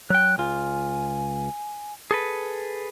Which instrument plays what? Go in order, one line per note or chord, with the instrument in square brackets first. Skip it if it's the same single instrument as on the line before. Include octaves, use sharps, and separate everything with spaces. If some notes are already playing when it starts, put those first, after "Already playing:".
[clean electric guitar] F#3 G5 [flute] F#6
[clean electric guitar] C#2 F4 [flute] G#5
[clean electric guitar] G#4 A4 B4